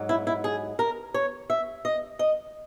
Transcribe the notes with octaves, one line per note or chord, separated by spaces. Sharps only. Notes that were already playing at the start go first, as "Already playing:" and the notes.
Already playing: G#2 F#3
E4
E4
G#4
A#4
C#5
E5
D#5
D#5